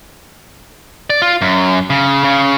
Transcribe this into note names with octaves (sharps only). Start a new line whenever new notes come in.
D5
F4
F#2
C#3
C#3